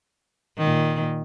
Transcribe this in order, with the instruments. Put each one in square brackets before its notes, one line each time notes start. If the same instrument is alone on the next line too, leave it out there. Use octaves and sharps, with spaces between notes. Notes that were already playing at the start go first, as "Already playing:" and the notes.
[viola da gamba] A#2 D#3